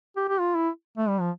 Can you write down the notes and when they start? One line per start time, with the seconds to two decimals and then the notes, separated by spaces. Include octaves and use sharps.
0.16 G4
0.29 G4
0.40 F4
0.55 E4
0.97 A3
1.09 G3
1.20 F3